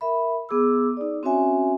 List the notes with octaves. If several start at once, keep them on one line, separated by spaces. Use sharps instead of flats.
A#4 E5 B5
B3 G#4 D6 E6
D#4 D5
C4 C#4 F#4 C#5 E5 G#5